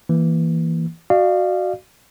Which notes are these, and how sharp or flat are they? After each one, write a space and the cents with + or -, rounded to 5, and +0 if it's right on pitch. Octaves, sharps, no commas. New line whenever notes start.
E3 +0 A#3 +0
F#4 +0 D5 +35 F5 -15